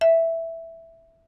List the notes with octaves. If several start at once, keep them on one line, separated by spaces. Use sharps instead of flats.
E5